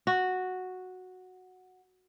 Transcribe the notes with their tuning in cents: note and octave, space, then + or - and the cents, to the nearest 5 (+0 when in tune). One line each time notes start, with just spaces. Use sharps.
F#4 -5